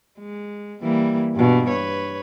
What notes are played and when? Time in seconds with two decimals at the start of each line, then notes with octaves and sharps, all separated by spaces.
0.19 G#3
0.82 E3 G3 A#3
1.34 G2 B2
1.68 B4 C#5